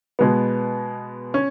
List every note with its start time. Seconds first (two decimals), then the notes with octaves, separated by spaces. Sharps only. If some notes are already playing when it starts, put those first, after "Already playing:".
0.19 B2 G#3 B3
1.34 C#4